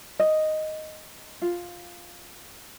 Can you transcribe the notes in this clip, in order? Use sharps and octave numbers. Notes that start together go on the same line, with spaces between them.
D#5
F4